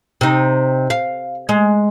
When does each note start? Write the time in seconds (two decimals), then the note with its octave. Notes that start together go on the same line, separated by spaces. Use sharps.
0.21 C3 D#4
0.90 F5
1.49 G#3